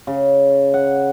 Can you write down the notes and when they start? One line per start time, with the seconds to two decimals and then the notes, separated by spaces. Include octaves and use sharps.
0.07 C#3
0.74 F#5